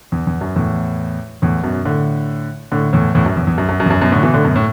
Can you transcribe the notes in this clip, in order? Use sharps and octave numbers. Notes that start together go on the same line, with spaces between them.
E2
E2
F#2
E2 A2
E2 A2
F#2 B2
A2 D3
A2 D3
E2 A2
E2 A2
F#2
E2
E2
F#2
F#2
F#2
E2
F#2
F#2 B2
A2 D3
B2 E3
A2 D3
F#2 B2
A2